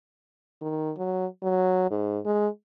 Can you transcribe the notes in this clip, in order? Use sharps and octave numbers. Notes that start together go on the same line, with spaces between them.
D#3
F#3
F#3
G#2
G#3